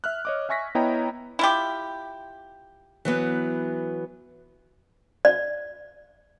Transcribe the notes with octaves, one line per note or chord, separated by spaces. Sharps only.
E5 F6 F#6
C#5 D#5 D6
E5 G#5 C#6 A#6 B6
B3 E4 C#5 D#5 G5 A#5
E4 F4 G4
E3 F#3 B3
D5